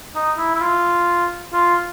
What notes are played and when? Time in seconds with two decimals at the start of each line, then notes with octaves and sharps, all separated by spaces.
0.15 D#4
0.38 E4
0.55 E4
0.61 F4
1.53 F4